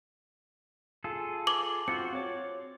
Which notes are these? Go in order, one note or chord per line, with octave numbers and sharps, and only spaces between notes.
F4 G#4 A4
D6 F#7
C4 F4 F#4 C#7
C#5 D6